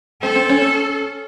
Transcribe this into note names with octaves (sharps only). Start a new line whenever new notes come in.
C4 A4
C4
C#4
C#4